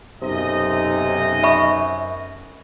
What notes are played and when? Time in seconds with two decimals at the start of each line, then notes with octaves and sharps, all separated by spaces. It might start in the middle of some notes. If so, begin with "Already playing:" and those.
0.22 B1 F#2 C3 D#4 D#5
1.43 E5 B5 C#6